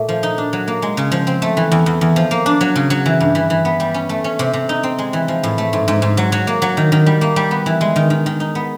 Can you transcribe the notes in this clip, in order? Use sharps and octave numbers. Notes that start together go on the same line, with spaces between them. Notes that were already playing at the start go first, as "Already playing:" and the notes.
Already playing: A#2 A3
F3
D#4
D4
F#3
A#3
G#3
C#3
F3
C4
A3
E3
E2
E2
E2
F3
A#3
D4
F#3
C#3
F#3
E3
G2
E3
E3
B3
G3
C#4
A3
C#4
C3
C3
D#4
C4
G#3
E3
F3
A2
A3
G#2
G#2
G#2
F#3
F#3
A#3
F#3
D#3
D#3
G3
A#3
G3
B3
E3
G#3
D#3
D#3
D#3
D#4
B3